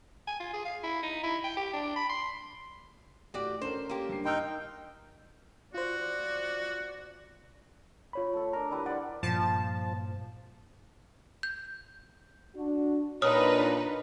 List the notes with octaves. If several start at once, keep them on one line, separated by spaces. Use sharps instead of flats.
G#5
F4
G#4
F5
E4
D#4
E4
G5
G4
D4
B5
C6
A2 F#4 G4 D5
C#4 A4 A#4 C5
A#3 G4
G2 C7
D#4 G5 C6 E6 F6
F4 F#4 C5 D5
F4 C#5 B5
A3 A4
D4 A#4 A#5
G3 E4 B4
C5 D5 F#5
G2 A#2 F3 A#3 A5
G6
D4 F#4
A#2 D4 D#4 B4 C#5 D#6 F6